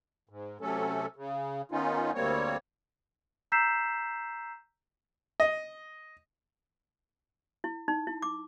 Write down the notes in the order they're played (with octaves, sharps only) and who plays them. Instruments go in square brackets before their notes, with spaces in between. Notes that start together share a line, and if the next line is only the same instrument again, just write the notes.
[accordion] G#2
C3 F#3 A3 C#4 A4
C#3
D#3 B3 C#4 D#4 F4
D2 G3 A#3 C4 C#5
[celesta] A#5 E6 G6 B6 C7 E7
[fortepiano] D#5
[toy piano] E4
D#4
E4
D6